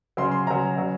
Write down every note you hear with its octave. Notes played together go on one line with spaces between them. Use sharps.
C#3 F#3 C6
C6
C#3 F#3 A#5
C#3 F#3